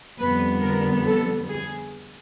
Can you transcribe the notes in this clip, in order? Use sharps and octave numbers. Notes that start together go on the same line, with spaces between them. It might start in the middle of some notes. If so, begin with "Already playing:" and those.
F2 D3 G3 B3 B4
A#4
A4
G#4